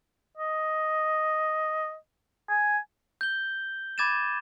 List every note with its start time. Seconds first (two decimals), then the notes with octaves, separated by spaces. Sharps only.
0.37 D#5
2.49 G#5
3.21 G6 G7
3.98 B5 D6 G#6 A6 D#7 E7